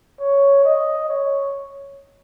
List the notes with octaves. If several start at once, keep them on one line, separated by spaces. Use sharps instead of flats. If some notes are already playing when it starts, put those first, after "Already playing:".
C#5
D#5
C#5